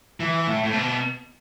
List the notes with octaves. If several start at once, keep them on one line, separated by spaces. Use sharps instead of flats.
E3
A2
A2
B2